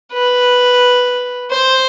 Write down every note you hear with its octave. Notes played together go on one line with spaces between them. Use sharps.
B4
C5